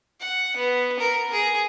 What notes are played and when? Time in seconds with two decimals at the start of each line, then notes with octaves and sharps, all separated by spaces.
0.20 F#5
0.56 B3
0.99 A#4
1.32 G#4